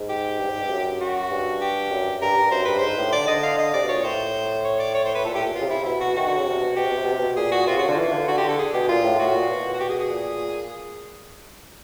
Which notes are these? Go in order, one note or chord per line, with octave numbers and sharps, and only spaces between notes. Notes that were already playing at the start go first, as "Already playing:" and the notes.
Already playing: G#2
G4
G2
G#2
G2
F#2
F#4
G2
G4
F#2
G2 A#4
G2
F#2 C5
G2 B4
G#2 C5
A2
D3 D5
D3 D#5
F5
D#5
C3 D5
B2
A#2 C#5
A2 C5
C#5
D5
C#5
C5
B4
A#2 A4
A2 G4
A#2
B2 F4
C#3
C3 E4
C3
B2 E4
F#4
D#3 F#4
D3
C#3
C3
B2
B2 G4
C3
B2
C3
B2
C3
B2
A#2 G#4
F#4
C3 F4
C#3 F#4
D3 F4
E3
D3
D3 F#4
G4
D3
A4
G#4
B2 G4
A#2 F4
A2
A2 F#4
A#2
B2
F#4
G4
G#4
G#4
A#2